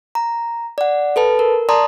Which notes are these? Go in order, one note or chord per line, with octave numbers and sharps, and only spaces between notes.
A#5
D5 F#5
A4 B4 A5
A#4
D5 A5 A#5 C6 D#6